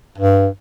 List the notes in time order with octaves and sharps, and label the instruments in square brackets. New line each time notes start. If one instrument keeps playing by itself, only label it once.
[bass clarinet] G2